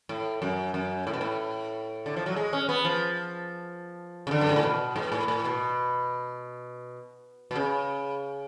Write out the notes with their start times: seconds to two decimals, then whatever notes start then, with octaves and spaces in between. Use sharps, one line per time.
0.09 A2
0.42 F#2
0.74 F#2
1.07 A2
1.14 B2
1.21 A2
2.06 D3
2.16 F3
2.26 F#3
2.36 G#3
2.53 C#4
2.69 B3
2.85 F3
4.27 C#3
4.31 D3
4.41 F#2
4.49 G#2
4.56 A2
4.63 B2
4.96 G#2
5.12 A2
5.28 A2
5.45 B2
7.51 B2
7.55 C#3